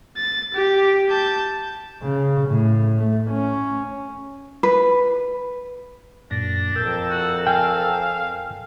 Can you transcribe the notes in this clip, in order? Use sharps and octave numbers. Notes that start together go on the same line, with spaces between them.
A6
G4
A5 G6
C#3
A2
A3
C#4
B4
F#2 A#2 D4 A#6
F2 A#4 G5 A5 E6
F#4
F5 G5 G#5